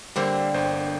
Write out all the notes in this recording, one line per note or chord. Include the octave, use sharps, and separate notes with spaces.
D3 G3 A#3 C4 C5
G1 C5 G5